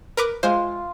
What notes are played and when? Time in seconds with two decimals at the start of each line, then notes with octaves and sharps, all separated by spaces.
0.17 A#4 B4 D6
0.43 G#3 F4 C5